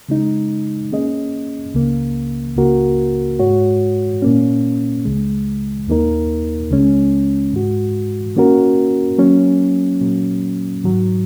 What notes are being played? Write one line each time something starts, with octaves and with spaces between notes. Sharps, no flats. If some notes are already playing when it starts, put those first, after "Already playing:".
C#3 G#3 D#4
D#3 A#3 C#4 G#4 D#5
C#2 C#3 A#3
C#2 C#3 A#3 F#4 A#4
G#2 G#3 F#4 C#5
A#2 A#3 C#4
C#2 C#3 G#3
D#2 D#3 A#3 D#4 A#4
C#2 C#3 G#3 C#4
G#2 D#3 G#3 F#4
D#3 A#3 C#4 F#4 A#4
F#3 A#3 C#4
A#2 F#3 A#3 C#4
G#2 D#3 F#3